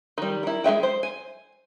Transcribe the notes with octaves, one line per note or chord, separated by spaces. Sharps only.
D#3 G3
E4 A#4
G#3 F4 E5 G5
C5
G#5